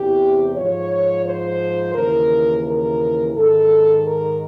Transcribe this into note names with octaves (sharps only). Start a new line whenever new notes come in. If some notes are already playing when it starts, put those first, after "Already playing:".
Already playing: E2 C3 E3 G4
G#2 F3 C#5
C5
D#2 C#3 E3 A#4
A#4
G#2 D#3 A4
A#4